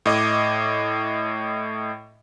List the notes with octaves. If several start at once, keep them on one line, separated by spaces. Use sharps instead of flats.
A2 D#5 D6